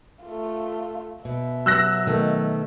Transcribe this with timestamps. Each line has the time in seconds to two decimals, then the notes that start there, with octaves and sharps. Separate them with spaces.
0.25 A3 F4
1.25 B2 E5
1.66 F#3 E6 F#6 A#6
2.06 B2 D#3 A3